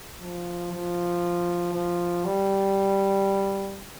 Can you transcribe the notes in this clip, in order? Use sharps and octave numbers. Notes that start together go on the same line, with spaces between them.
F3
F3
F3
G3